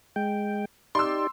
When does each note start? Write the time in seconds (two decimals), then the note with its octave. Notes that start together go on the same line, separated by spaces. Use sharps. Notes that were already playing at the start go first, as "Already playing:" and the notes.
0.16 G#3 G5
0.95 D#4 G4 D5 C6 E6